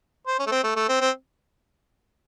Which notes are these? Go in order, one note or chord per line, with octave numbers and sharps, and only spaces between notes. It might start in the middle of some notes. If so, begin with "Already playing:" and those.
C5
C#4
A3
C4
A3
A3
C4
C4